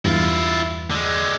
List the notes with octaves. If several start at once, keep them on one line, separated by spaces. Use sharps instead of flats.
E2 G2 E4 F4
D3 G#3